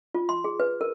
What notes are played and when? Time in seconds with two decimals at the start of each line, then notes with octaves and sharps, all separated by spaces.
0.14 F4
0.29 C6
0.44 G#4
0.60 B4
0.81 A#4